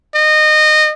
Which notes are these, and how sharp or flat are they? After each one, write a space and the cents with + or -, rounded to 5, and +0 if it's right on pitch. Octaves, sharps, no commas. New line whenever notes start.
D#5 -25